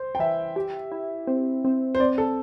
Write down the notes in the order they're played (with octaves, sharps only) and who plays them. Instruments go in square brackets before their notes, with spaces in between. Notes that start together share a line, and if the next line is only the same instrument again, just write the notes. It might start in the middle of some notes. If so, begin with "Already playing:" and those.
Already playing: [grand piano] C5
G5
[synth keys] E3 [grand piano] E5
[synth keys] G4
E4
C4
C4
[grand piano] C5
[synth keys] C4 [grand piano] D5
[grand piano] A4